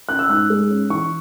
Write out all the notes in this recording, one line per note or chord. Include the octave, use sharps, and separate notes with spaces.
C#4 F#6
E6
G#2 F#6
G#3
C#4
E3 C#6